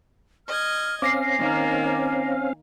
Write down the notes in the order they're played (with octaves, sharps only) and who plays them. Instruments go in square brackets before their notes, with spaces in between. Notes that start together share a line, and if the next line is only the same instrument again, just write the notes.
[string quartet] D#5 G#6 [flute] F6
[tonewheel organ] C4 C#4 F5 [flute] G#5 [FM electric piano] D6 A#6 C7
[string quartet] D#3 A#3